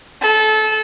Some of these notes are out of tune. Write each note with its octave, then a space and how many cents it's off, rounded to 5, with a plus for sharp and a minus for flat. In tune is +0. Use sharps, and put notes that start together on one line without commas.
A4 -25